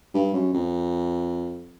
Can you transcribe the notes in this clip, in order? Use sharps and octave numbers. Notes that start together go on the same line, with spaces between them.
G2
F#2
F2